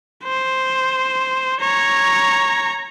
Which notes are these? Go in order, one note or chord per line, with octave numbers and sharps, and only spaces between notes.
C5
C#5 A#5